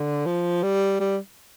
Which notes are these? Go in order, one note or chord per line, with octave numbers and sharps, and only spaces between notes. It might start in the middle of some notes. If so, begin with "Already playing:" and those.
Already playing: D3
F3
G3
G3